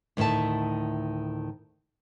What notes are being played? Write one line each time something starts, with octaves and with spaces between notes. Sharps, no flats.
D2 A2 D#3 E5 A5